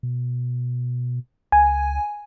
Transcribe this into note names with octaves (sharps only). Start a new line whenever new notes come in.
B2
C#2 G#5